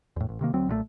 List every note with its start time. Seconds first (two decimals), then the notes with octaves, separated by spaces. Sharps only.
0.16 E2 A2
0.29 A1
0.41 C3 D#3 A#3
0.53 D2 F#3 C4
0.68 B1 A#2 C#3 A3